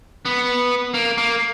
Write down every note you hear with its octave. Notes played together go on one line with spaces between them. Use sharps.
B3
A#3
A#3